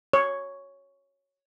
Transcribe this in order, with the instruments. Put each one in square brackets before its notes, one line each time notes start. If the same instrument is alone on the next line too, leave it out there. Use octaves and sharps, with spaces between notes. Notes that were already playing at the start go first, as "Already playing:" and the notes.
[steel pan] C#5